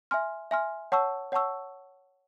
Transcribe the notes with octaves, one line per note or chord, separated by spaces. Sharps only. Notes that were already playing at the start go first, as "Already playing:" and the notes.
E5 G#5 C6 F6
E5 G#5 C6 F6
C#5 F#5 A5 C#6 E6
C#5 F#5 A5 C#6 E6